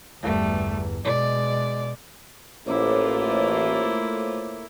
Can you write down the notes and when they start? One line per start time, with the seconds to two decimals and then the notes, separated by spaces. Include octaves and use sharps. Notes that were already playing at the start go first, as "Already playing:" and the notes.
0.23 G1 E2 G3 A3
1.05 B2 G#3 D5
2.67 A1 A3 A#3 E4 F4 C5 C#5 D6